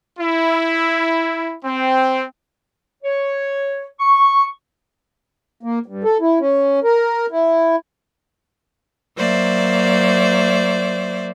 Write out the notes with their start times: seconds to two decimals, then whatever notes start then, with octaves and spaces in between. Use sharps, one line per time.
0.19 E4
1.64 C4
3.03 C#5
4.00 C#6
5.63 A#3
5.86 G2
6.04 A4
6.21 E4
6.40 C#4
6.84 A#4
7.31 E4
9.15 F#3 A#3 C5 D5 E5